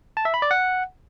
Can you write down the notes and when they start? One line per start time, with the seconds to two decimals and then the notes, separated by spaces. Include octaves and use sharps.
0.17 A5
0.25 E5
0.34 B5
0.42 D5
0.51 F#5